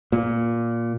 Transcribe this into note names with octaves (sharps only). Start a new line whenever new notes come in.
A#2